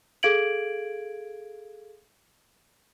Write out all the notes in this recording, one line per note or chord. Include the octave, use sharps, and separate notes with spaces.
G#4 A4 F5 G#6 D7 F#7